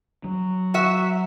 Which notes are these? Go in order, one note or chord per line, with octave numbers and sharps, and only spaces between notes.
F#3
F#4 E5